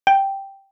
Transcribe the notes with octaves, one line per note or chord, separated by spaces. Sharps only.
G5